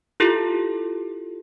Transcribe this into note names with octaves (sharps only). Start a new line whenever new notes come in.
E4 F4 G4 A4